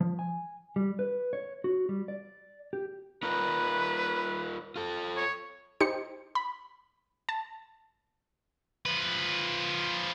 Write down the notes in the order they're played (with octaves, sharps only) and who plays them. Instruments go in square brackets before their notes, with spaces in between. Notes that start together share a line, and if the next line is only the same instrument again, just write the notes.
[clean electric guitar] F3
G#5
G3
B4
C#5
F#4
G3
D5
G4
[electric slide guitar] D#4 F4 A#4 [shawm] B4
[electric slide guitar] F4 A4
[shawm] C#5
[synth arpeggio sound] D#4 G4 C5 C#7
B5
A5
[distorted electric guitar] F3 B4